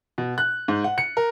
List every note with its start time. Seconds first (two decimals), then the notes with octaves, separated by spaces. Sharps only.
0.18 B2
0.38 F#6
0.68 G#2
0.84 F#5
0.98 C#7
1.17 A#4